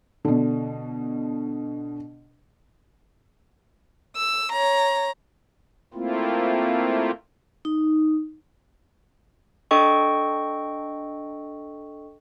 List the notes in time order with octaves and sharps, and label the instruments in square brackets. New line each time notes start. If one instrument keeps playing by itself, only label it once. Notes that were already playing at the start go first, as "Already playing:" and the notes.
[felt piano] B2 D3
[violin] E6
C#5 A#5
[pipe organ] A3 A#3 C4 E4 F4
[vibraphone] D#4
[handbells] D4 A4 D#5 G5 C#6